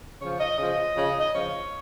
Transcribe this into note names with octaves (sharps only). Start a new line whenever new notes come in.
C#3 F3 C#5
D#5
C#3 F3 D#5
C#3 F3
D#5
C#3 F3 C#5